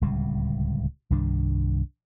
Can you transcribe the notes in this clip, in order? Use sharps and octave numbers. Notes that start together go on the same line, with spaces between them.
D1 C#2 C3 G3
C2 G2 D#3 D4